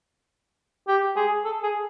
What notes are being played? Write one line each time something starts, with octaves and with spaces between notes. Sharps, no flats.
G4
G#4
A4
G#4